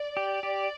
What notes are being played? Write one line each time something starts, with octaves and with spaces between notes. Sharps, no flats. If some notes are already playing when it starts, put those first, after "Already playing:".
Already playing: D5
G4
G4